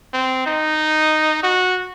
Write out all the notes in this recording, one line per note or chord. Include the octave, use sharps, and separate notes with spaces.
C4
D#4
F#4